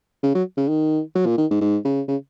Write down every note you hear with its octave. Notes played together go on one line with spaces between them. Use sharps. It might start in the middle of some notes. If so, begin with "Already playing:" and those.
C#3
F#3
C#3
D#3
F#3
A#2
D#3
G#2
G#2
C#3
C#3